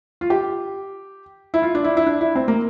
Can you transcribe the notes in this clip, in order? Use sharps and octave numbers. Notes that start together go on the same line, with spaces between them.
F4
G4
E4
F4
D4
E4
E4
D4
E4
C4
A#3